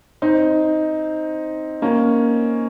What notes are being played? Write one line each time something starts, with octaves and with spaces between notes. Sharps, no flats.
C4 D#4
A#3 C#4